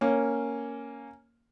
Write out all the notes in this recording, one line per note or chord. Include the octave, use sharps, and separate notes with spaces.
A#3 C#4